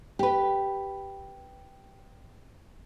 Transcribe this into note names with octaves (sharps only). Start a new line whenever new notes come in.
G4 B4